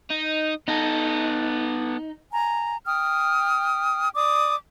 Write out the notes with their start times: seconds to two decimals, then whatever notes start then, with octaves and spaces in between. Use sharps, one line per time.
0.11 D#4
0.68 B3 D#4 A4
2.32 G#5 A#5
2.86 G5 D#6 F6
4.14 D5 D6 D#6